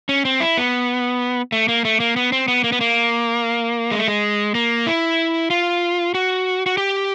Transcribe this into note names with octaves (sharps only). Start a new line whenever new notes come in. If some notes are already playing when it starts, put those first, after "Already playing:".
C#4
C4
E4
B3
A3
A#3
A3
A#3
B3
C4
B3
A#3
B3
A#3
G#3
A3
G#3
A#3
E4
F4
F#4
F#4
G4